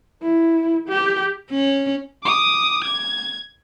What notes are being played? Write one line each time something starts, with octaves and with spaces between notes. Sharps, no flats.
E4
G4
C#4
D6 D#6
G#6